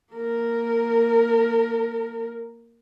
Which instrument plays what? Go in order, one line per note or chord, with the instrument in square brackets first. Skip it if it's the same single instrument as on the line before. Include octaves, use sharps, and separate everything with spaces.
[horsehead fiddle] A#3 A#4